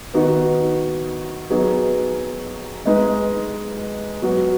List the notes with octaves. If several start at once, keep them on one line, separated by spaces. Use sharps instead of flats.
D#3 B3 D#4 F#4
F#3 B3 D#4 G#4
G#3 D#4 B4 D#5
F#3 B3 F#4